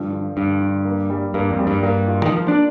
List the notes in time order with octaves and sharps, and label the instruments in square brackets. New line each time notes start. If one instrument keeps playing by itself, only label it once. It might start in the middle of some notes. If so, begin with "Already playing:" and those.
Already playing: [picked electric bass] G2 [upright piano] D3 F3
[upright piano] D3
[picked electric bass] G2 [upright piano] D3
[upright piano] D3
A#3
G3
[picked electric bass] G2 [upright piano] A#3
[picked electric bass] F2
[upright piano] G3
[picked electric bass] G2
[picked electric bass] G2 [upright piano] A#3
[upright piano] F4
[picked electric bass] D#3
[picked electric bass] F3 [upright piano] A#3
[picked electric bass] D4